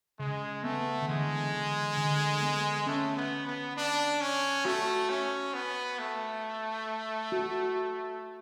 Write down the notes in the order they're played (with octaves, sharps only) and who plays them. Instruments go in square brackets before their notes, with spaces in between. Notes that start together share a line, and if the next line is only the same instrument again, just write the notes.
[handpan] C#3 [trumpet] G#3
[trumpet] A3 [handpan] B3
[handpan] D3
[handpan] E3 [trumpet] G#3
[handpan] D3
D3
B3
[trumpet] A3 [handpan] C#4
[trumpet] B3
B3
D4
C#4
[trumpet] A3 [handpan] F#4
[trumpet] C#4
B3
A3
[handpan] F#4